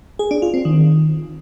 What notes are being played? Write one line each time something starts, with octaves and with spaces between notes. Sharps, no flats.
G#4
D4
F4
C4
D#3